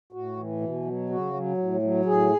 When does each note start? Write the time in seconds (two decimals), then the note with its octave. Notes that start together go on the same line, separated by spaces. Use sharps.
0.12 A2 F#4
0.37 E3
0.61 B2
0.85 F#3
1.09 C#3 F#4
1.34 F#3
1.58 A2
1.82 F#3
2.06 A2 G#4